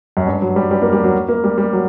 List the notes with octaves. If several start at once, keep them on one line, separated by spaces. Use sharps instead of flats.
F#2
G2
F#3
G3
G3
A#3
G3
F#3
A#3
G3
G3
F#3